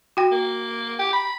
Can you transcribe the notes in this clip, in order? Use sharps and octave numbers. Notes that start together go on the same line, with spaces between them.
F#4 G5
A#3
G4
B5